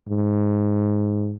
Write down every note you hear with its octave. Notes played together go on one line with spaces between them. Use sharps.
G#2